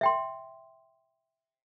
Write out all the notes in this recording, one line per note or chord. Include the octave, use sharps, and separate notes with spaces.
E5 G5 C6